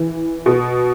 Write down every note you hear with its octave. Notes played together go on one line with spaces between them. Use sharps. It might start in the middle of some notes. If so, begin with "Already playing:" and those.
Already playing: E3
B2